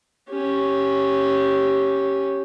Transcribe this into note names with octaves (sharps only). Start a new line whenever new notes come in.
C#4 G4